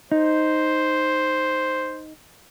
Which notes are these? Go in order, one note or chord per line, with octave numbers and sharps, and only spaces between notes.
D#4 C5